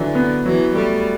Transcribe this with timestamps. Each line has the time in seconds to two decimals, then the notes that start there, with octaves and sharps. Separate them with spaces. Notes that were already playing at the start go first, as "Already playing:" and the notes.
Already playing: D3 E3 F#3
0.15 B3
0.45 E3 F#3
0.75 G3 A3